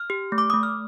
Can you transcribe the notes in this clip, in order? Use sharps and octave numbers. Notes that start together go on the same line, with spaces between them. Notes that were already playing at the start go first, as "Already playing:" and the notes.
Already playing: F6
G4
A3
D6
A3 D#6
F6